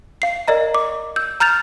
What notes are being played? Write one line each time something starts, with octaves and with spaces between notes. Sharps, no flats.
F5 C7
A#4 D5 D#5 A#5
D6
E6 G6
A#5 F6 G6 A6 F7